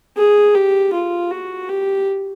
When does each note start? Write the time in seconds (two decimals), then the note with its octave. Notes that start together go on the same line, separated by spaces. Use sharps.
0.17 G#4
0.55 G4
0.93 F4
1.31 F#4
1.69 G4